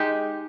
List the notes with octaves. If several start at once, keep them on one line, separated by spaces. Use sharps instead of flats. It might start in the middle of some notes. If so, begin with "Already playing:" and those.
Already playing: G#3 D#4 G4